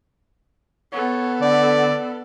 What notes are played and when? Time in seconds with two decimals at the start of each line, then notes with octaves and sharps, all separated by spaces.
0.92 B3 A4 C#5
1.41 D3 D5